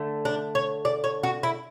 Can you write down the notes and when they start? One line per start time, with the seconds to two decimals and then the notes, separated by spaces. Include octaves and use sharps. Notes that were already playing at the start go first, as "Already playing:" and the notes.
Already playing: D3 A3
0.25 D4
0.55 C#5
0.85 D5
1.04 C#5
1.23 F#4
1.43 E4